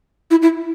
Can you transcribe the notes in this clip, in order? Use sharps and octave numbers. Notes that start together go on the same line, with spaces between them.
E4
E4